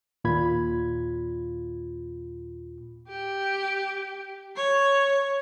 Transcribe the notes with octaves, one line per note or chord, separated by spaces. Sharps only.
D#2 A#2 F4 B5 G#6
G4
C#5